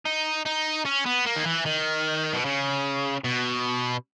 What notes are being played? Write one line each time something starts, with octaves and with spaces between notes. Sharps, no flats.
D#4
D#4
C#4
B3
A#3
D#3
E3
D#3
B2
C#3
B2